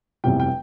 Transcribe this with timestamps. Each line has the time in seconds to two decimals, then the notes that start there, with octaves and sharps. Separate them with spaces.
0.24 F1 E2 C3 E3 G3 G5
0.40 G5